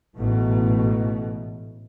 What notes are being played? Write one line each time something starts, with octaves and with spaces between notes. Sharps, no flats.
A1 G#2 B2 A3